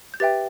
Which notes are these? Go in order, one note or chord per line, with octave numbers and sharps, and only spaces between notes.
G6
G4 B4 E5 G5 A6